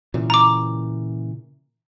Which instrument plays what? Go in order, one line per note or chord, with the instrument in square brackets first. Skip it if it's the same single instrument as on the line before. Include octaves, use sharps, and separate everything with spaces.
[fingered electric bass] A#2 C#3 E3
[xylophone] A#5 D6